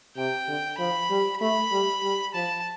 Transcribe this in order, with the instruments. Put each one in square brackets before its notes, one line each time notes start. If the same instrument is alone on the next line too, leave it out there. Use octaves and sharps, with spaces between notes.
[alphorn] C3 [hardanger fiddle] G5
[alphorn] D3
[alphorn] F3 [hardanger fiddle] B5
[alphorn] G3
[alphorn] A3 [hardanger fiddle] B5
[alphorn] G3
G3
[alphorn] F3 [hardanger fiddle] A5